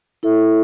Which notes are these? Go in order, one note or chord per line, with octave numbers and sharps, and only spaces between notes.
E4 A4 E5